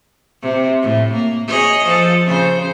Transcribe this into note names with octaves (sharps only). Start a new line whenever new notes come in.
C3
A2
A#3
G#4 C#5 D#5
F3 A4
C#3 C5